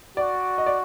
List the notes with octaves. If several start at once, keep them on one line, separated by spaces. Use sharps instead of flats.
F#4 D5
D#5
D5